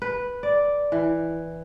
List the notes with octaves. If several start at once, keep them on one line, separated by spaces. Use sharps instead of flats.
B4
D5
E3